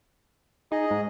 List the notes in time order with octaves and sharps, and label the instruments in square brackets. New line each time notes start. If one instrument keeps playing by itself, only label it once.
[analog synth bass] D#4 [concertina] G#4 D#5
[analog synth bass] G#2